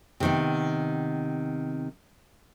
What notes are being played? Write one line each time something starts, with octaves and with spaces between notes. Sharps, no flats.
C3 D#3 B3